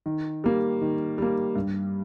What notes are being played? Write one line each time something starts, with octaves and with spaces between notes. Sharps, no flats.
D#3
G3 A#3
D#3
G3 A#3
G2